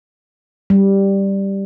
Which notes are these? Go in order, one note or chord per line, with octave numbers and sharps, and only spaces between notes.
G3